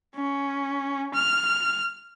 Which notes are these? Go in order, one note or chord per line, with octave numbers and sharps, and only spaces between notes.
C#4
F6